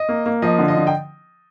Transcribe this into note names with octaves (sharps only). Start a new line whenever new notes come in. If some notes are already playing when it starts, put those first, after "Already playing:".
Already playing: D#5
A#3
A#3
F3 D#5
D3
D#5
D3
G5